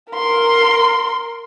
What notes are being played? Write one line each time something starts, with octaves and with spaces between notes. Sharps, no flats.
A#4 C6